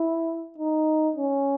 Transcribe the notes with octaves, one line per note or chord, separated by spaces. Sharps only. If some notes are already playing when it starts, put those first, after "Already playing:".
Already playing: E4
D#4
C#4